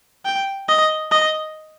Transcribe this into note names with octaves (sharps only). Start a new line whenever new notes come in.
G5
D#5
D#5